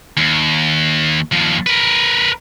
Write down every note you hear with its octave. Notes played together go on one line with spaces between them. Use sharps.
D#2
D#2 F3
A#4 B4